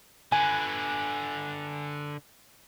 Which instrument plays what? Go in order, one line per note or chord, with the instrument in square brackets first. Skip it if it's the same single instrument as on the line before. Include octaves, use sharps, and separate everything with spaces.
[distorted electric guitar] D3 B4 [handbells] G#5